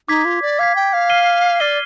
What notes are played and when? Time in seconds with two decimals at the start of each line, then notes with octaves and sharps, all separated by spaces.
0.08 D#4 D6 G#6 B6
0.25 F4
0.42 D5
0.59 F5 D6 G#6 B6
0.76 G5
0.93 F5
1.10 F6 C7 D#7 G7
1.60 D5 F6 C7 D#7 G7